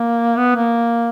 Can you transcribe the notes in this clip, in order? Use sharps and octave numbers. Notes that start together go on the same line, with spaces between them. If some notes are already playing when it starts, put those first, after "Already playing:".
Already playing: A#3
B3
A#3